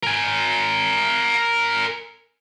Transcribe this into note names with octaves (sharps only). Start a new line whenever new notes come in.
A#4 G#5